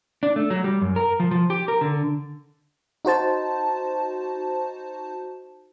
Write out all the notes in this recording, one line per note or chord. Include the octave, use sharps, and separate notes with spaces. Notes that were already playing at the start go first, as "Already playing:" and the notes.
D4
A3
F#3
G3
F#2
A#4
F3
F3
G4
A#4
D3
D#4 F#4 C5 A5